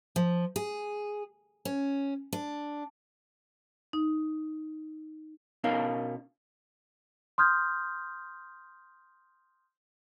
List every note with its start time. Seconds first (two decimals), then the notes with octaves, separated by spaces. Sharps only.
0.16 F3
0.56 G#4
1.65 C#4
2.33 D4
3.93 D#4
5.64 B2 C#4 D#4 A#4 F5
7.38 C6 D#6 F6 G6 G#6